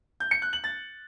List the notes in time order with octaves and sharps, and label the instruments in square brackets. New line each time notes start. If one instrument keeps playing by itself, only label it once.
[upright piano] G6
C#7
F#6
F#7
A6